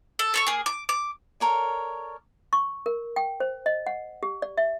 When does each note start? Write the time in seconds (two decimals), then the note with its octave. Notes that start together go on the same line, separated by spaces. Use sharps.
0.19 A4
0.34 A4 C#5 C#6
0.47 A#3 G#4
0.66 D6
0.89 D6
1.40 A4 A#4 C#5 D5
2.53 C#6
2.86 A#4
3.16 G5
3.40 C5
3.66 D#5
3.87 F#5
4.23 G4
4.42 D5
4.58 E5